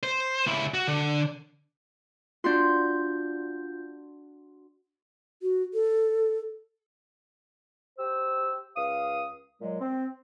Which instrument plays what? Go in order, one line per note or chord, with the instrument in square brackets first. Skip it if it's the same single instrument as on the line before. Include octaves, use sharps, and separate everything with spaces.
[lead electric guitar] C5
C#2 E4
F#4
D3
[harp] D4 F#4 C6 [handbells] F4 G6
[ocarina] F#4
A4
[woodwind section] G4 C5 E6
C#2 F5 D#6
A#2 F#3 G#3
C4